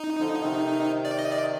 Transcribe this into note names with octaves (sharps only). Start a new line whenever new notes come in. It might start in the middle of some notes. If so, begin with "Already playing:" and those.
Already playing: D#4
D3 F3
C3 D#3
D5
D#5
D5